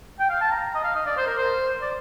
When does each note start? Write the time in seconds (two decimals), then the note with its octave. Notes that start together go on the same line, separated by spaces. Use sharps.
0.19 G5
0.30 F5
0.41 A5
0.51 A#5
0.74 D#5
0.84 F5
0.95 D#5
1.06 D5
1.17 C5
1.27 A#4
1.37 C5
1.81 D5